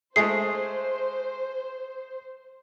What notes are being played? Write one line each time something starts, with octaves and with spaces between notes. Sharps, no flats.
G#3 A3 G#4 C5 C7